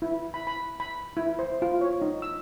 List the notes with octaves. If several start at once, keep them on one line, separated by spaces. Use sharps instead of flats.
E4
B5
B5
B5
E4
C5
F4
C#5
D#4
E6